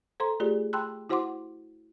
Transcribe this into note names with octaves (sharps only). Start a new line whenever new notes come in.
A4 C5 A#5 C6
A3 F4 G4 G#4 D5
G5 A5 B5 C6 E6 F#6
E4 F#4 C5 F#5 C6 D6